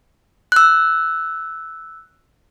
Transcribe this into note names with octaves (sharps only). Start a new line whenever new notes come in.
E6 F#6